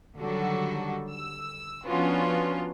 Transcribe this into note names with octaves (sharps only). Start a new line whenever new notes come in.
D3 D#3 F#3 G3 F#4 A4
E6
F3 B3 C#4 D4 F4 F#4